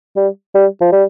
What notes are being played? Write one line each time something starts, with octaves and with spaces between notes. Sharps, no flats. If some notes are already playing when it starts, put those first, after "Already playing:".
G3
G3
F3
G3